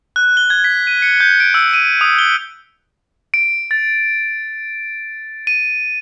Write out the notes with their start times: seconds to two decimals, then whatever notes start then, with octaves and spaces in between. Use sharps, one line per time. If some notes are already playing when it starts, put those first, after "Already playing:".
0.16 F#6
0.37 G7
0.50 G#6
0.64 B6
0.87 D#7
1.02 C#7
1.20 G6
1.40 D7
1.54 E6
1.74 D#7
2.01 D#6
2.19 G7
3.34 D7
3.71 A6
5.47 D#7